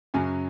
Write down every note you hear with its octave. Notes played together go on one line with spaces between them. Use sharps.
F#2 C#3 F#3 G#5